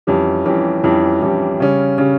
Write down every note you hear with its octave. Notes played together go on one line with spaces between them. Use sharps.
F2 E3 G3 C#4 G4
F2 E3 G3 C#4 G4
F2 E3 G3 C#4 G4
F2 E3 G3 C#4 G4
C#3 G3 C#4
C#3 G3 C#4